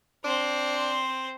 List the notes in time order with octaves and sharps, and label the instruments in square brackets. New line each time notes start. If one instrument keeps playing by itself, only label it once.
[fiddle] C4 C5 [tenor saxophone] D4